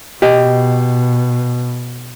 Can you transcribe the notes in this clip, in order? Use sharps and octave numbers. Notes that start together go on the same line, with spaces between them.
B2 G4 D#5